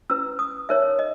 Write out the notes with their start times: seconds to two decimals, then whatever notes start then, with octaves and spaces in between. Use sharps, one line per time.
0.10 C#4 E4 B4 E6
0.39 D#6
0.69 D#4 A#4 C#5 E5
0.99 D#5